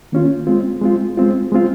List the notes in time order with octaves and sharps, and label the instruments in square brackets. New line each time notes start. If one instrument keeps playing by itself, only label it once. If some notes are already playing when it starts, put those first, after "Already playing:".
[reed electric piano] D#3 A#3 C#4 F4
G#3 C4 F4
G#3 C4 F4
G#3 C4 F4
G#3 C4 F4